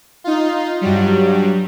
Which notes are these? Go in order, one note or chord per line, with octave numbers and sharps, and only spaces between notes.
D#4 F4
G2 F#3 G3